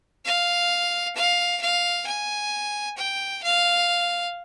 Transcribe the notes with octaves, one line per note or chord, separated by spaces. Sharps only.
F5
F5
F5
G#5
G5
F5